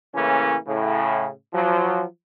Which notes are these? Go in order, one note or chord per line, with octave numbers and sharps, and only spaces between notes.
A2 C#3 E3 A#3 C#4
A2 C#3
F3 F#3